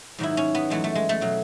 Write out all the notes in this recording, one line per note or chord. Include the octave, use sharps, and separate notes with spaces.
G#2 D#3 F#3 E4
C#4
B3
F#2 E3 G#3 A3
A3
G#3
A3
B2 F#3